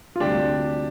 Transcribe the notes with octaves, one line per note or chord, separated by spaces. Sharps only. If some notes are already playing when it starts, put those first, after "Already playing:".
F4
D2 C3 G3 D4 G4